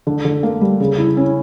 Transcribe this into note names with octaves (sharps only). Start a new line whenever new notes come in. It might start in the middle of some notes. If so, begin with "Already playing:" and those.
D3
D3
A#3
G3
C#3
E4
C#4